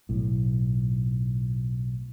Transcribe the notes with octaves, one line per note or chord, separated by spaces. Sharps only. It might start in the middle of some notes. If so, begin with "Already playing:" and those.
B1 A2